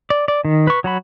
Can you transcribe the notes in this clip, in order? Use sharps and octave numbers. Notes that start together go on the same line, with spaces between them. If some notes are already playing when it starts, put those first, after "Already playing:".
D5
D5
D#3
B4 C#6
F#3 F#4 B5